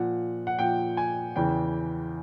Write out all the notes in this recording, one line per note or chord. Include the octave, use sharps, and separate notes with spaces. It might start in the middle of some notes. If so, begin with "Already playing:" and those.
Already playing: A#2 F3 F#5
F#5
A#2 F3 G5
G#5
E2 C#3 E3 G5